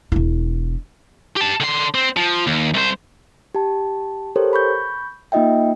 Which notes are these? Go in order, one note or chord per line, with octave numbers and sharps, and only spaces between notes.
E1 E4
G4 A5
D3 C6
C4
F3
D#2
C2 C5
G4 A5
G4 A4 A#4 C5 C#5
B5 C#6 G6
A#3 D#4 F4 D#5 E5 G5